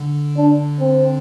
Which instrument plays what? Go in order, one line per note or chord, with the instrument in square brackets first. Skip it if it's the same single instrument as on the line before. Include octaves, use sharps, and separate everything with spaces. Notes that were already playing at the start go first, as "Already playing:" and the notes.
Already playing: [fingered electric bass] D3
[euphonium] D4
C4